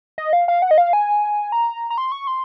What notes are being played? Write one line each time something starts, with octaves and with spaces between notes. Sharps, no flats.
D#5
F5
F5
F#5
D#5
F5
G#5
A#5
A#5
C6
C#6
C6